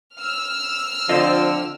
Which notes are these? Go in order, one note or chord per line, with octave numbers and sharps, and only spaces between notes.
E6 F6
D3 F3 C4 F4 D#5